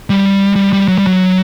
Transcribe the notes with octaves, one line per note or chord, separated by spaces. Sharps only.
G3
G3
G3
F#3
G3
F#3